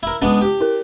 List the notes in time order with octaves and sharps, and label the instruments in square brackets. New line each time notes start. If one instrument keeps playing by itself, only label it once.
[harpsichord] E4 A#4
[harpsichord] G#3 B3 D4 [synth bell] C#4
[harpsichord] G4
[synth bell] E4 A#4